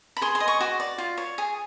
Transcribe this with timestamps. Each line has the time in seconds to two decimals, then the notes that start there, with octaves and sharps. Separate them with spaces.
0.17 B5
0.21 G#4 C6
0.35 C6
0.40 D#5
0.48 C#6
0.60 F#4 D6
0.80 D5
0.98 F4
1.18 C#5
1.38 G#4